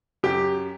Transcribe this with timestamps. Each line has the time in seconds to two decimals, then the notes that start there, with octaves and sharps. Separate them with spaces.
0.23 F#2 G4